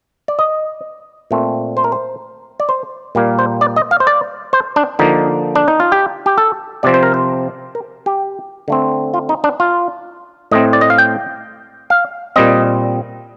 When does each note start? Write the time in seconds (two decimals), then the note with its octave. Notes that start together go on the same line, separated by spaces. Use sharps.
0.28 D5
0.39 D#5
1.31 A#2 A3 C4
1.77 C5
1.84 A#4
1.92 C5
2.60 D5
2.69 C5
3.15 A#2 G3 A#3
3.39 C5
3.61 D5
3.76 D#5
3.91 F5
4.00 C5
4.07 D5
4.53 C5
4.76 D4
4.99 D3 F3 A#3 D#4
5.55 D4
5.68 D#4
5.80 F4
5.92 G4
6.26 G4
6.38 A4
6.83 C3 F3 C4 D5
6.94 C5
7.03 A#4
7.14 C5
7.75 A#4
8.06 G4
8.68 D3 A3 C4
9.14 F4
9.29 D#4
9.44 D4
9.60 F4
10.51 A2 A3 C4 D#5
10.73 D5
10.81 D#5
10.90 F5
10.98 G5
11.90 F5
12.36 A#2 G3 C4 D#5